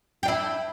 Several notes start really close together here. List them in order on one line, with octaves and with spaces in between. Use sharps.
G4 D4 E4